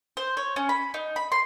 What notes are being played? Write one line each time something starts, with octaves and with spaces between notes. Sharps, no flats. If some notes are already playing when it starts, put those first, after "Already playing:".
C5
C#5
C#4
B5
D#4
B5
C6